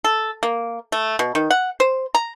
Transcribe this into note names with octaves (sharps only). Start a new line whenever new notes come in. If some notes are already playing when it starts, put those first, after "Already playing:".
A4
A#3
A3
B2
D#3
F#5
C5
A#5